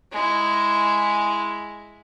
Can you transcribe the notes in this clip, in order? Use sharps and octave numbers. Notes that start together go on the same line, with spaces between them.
G#3 E4